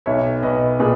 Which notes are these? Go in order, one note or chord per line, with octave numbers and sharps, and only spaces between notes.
B1 C#5 E5
B1 B4 D#5
A#2 G#4 B4